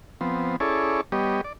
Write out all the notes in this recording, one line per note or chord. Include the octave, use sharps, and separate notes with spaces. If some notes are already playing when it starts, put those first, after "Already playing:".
F3 B3 C4
C#4 E4 G#4 A4 C#5 D5
G3 B3 G4 C#5 D#5
D5